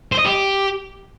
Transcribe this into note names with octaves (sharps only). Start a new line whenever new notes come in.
C5
D#5
G4